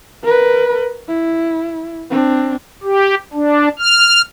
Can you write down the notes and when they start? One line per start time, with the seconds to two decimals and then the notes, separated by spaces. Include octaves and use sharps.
0.24 A#4 B4
1.08 E4
2.10 C4 D4
2.83 G4
3.33 D4
3.79 F6